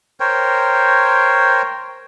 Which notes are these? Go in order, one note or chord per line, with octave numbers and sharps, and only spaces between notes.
A#4 C5 C#5 G5